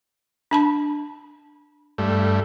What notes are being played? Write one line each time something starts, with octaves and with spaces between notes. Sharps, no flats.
D4 A5 B5
G2 A3